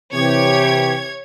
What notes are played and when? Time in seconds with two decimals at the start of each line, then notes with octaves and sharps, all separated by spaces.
0.14 C3 E3 G4 C#5 G#6